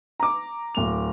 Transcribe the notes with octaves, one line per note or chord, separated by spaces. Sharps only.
A#5 D6
D1 F7